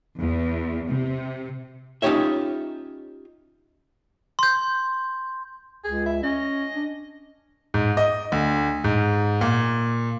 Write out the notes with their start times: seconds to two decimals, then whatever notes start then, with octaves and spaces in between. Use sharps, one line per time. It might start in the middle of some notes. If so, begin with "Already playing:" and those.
0.20 E2
0.89 C3
2.02 C#4 D#4 F4 G4 C#5 E5
4.39 C6 G6
5.84 C#2 G#4
6.06 E5
6.23 C#4 D#5
6.75 D4
7.74 G#2
7.97 D#5
8.32 D2
8.84 G#2
9.41 A#2